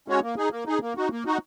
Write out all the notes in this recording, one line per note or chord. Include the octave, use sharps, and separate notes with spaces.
G#3 C#4 F#4 C#5
A#3
D#4 G#4
A#3
D#4 G#4
A#3
D#4 F#4
A#3
D#4 F#4